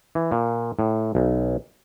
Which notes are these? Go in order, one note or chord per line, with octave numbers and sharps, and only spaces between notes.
E3
A#2
A2
B1